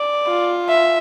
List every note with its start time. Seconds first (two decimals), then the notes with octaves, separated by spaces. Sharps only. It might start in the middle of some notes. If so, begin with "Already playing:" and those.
Already playing: D5
0.27 F4
0.69 E5